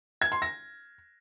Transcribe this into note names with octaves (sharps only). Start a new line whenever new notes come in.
G#6
C6
A#6